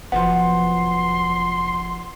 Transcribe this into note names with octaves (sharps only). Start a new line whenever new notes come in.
F1 F3 F#3 B3 F#5 C6